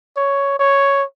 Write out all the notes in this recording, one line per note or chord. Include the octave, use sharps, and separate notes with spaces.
C#5
C#5